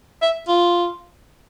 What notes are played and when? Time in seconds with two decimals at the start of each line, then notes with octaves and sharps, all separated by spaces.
0.22 E5
0.48 F4